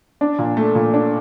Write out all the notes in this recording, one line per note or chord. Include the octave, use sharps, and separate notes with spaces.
D4
A#2
A3
A#2
D4